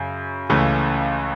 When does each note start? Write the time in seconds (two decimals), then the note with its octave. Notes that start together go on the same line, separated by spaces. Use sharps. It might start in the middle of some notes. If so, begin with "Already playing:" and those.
Already playing: F#2 C#3
0.50 C#2 C#3 E3 A3 C#4